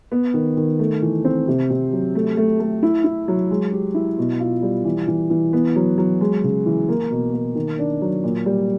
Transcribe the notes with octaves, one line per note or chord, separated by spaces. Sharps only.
B3
D#3
D#3
A3
E3
C4
C3
C3
F#3
A3
A3
A3
E4
E4
F#3
G#3
G4
E4
B2
F4
G3
E3
E3
E3
B3
F#3
F#3
G#3
C#3
E3
A#3
B2
A#3
D#3
D4
F#3
A#2
G3